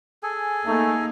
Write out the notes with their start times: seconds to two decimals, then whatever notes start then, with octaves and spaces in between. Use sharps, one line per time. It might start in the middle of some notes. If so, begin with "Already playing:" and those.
0.23 G#4 A4 G#5
0.66 A3 A#3 D#4